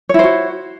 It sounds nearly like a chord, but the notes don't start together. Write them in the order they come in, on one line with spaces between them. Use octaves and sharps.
C#5 E4 C5 F#4